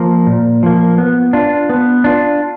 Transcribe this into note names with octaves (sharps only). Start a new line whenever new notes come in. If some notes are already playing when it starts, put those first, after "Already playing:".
Already playing: F3 A#3
A#2
F3 A#3
B3
D4 F4
B3
D4 F4